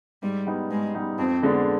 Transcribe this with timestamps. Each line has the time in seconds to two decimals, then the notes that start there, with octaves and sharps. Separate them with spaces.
0.23 G#2 G3
0.47 G3 B3 D#4
0.71 G#2 G#3
0.95 G3 B3 D#4
1.18 F2 C4
1.43 D3 G#3 B3 D4